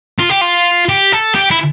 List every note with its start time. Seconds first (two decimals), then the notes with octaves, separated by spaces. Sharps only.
0.19 F4
0.30 G4
0.42 F4
0.89 G4
1.12 A4
1.35 G4
1.51 E4